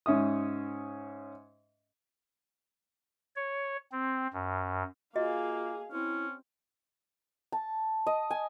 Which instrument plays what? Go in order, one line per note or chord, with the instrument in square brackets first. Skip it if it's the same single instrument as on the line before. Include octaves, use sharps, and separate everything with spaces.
[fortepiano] G#2 C#4 E5 D#6
[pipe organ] C#5
C4
F#2
[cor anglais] A#3 [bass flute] F4 [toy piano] F#4 D#5 [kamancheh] G#4 F5
[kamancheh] C4 [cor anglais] C#4 [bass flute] E4
[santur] A5
D#5
G#5